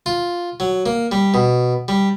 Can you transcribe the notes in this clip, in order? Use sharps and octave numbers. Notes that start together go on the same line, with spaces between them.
F4
F#3
A#3
G3
B2
G3